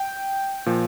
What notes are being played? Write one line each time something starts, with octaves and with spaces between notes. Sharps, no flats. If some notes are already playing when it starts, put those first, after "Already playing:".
Already playing: G5
A#2 F3